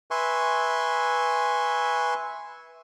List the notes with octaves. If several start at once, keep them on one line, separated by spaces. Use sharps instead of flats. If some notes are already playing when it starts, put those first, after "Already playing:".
B4 E5 G#5 C6 C#6